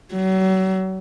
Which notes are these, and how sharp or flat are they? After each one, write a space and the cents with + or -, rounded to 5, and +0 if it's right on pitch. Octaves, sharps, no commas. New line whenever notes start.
F#3 +35